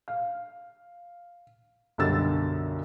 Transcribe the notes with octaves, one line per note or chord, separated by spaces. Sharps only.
F5
B1 F#2 D3 G3 E6 A6